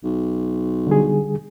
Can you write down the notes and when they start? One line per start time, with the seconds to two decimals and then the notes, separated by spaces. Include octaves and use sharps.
0.04 B1
0.87 D3 G3 G#4